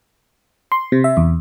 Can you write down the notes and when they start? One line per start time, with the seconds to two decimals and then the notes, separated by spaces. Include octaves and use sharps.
0.72 C6
0.92 C3
1.04 E5
1.17 E2